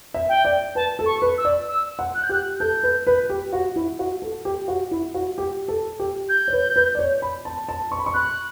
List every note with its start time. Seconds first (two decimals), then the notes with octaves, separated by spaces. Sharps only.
0.14 E5
0.29 G5
0.45 D5
0.75 B4 A5
0.99 A4
1.06 C#6
1.22 B4
1.38 E6
1.45 D5
1.69 E6
1.99 F#5
2.15 F#6
2.23 G6
2.29 G4 F#6
2.60 A4 G6
2.83 B4
3.07 B4
3.30 G4
3.53 F#4
3.76 E4
3.99 F#4
4.22 A4
4.45 G4
4.68 F#4
4.91 E4
5.14 F#4
5.38 G4
5.68 A4
5.99 G4
6.29 G6
6.48 C#5
6.53 B4
6.76 B4
6.95 D5
6.99 C#5
7.22 B5
7.45 A5
7.69 A5
7.92 C#6
7.99 B5
8.06 C#6
8.14 B5 F#6